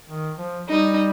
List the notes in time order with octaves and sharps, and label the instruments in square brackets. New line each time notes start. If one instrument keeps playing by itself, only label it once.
[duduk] D#3
F3
[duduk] G3 [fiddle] D#4